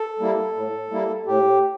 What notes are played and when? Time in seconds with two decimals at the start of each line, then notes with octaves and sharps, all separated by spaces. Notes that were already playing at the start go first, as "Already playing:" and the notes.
Already playing: A4
0.19 G3 A#3 E4
0.55 A2
0.91 G3 A#3 E4
1.26 A2 G4